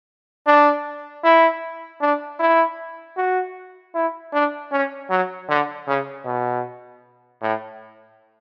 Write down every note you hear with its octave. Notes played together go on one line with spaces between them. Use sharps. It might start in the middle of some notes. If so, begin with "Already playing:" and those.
D4
E4
D4
E4
F#4
E4
D4
C#4
F#3
D3
C#3
B2
A2